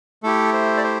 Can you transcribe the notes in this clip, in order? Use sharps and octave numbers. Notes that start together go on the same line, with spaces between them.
A3 E4 G4 A4
C5
D5
C5